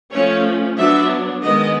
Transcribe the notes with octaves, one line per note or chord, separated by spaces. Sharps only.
F3 A3 C#4 C#5
F#3 B3 D4 E5
D#3 G#3 B3 D#5